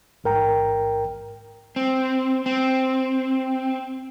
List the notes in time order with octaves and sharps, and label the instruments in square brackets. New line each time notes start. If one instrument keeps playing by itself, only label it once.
[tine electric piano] A1 G#2 A#4 G5 A#5
[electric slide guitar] C4
C4